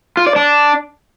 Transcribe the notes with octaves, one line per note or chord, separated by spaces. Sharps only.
F4
D5
D4